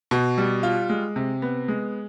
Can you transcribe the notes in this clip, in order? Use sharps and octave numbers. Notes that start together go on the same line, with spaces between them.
B2
G3
F4
G#3
C3
B3
G#3